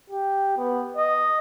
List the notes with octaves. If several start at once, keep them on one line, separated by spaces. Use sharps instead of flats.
G4
B3
D#5